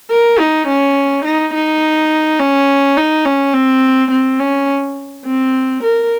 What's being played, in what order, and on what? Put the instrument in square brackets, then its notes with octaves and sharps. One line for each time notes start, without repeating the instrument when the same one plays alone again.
[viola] A#4
D#4
C#4
D#4
D#4
C#4
D#4
C#4
C4
C4
C#4
C4
A#4